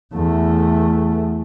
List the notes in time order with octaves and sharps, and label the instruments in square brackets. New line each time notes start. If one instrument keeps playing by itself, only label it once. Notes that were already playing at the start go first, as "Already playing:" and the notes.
[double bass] E2 A3